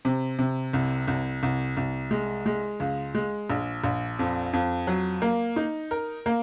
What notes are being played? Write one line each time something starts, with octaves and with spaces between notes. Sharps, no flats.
C3
C3
C2
C2
C2
C2
G#3
G#3
C#2
G#3
A#1
A#1
F2
F2
F#3
A#3
D#4
A#4
A#3